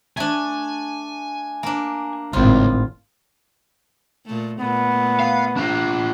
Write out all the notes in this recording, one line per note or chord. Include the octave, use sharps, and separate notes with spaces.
A3 D4 G#5
A#3 D4
G#1 C#2 A2 F4
A#2 A3
A#2 A3 B3
F5
D4 F4